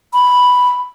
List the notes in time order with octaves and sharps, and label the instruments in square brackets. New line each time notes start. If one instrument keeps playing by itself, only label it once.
[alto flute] B5